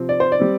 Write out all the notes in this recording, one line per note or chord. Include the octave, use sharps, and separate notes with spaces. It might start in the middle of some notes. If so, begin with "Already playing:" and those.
Already playing: C3 F3 C4
D5
C5
D5
G3 C4